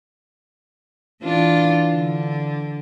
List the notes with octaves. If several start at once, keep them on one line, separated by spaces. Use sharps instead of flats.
E3 D4 F4
D3